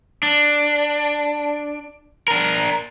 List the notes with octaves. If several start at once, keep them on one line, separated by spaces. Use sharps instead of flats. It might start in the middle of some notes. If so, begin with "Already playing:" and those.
D4
D4 A#4